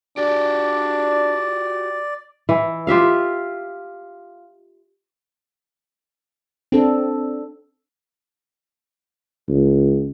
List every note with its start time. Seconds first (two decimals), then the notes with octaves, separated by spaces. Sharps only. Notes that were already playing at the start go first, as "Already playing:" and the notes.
0.17 D4 F#4 G4 D5
2.49 E3
2.87 F4 G4 E5 F5
6.72 C4 D4 A4
9.49 C#2